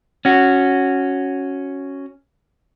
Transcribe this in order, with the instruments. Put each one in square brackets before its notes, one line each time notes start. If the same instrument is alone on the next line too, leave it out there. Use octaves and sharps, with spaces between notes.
[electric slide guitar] C#4 F#4